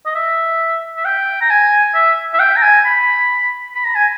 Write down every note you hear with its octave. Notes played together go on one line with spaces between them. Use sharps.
D#5
E5
E5
G5
A#5
G#5
E5
E5
G5
A#5
G#5
B5
B5
A#5
G#5